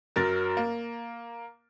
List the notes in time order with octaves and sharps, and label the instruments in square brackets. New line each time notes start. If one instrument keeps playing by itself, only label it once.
[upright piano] F#2 F#3 A#4 A6
A#3